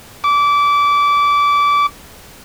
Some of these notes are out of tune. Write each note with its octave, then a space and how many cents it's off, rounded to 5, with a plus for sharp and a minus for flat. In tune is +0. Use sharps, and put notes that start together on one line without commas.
D6 -25